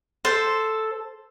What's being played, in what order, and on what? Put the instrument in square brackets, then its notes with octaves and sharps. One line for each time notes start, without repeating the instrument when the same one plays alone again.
[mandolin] A4 C5